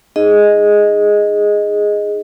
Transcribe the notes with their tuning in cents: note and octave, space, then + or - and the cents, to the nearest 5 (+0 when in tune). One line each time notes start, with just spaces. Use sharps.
D#4 +0 G#4 +0 D#5 +0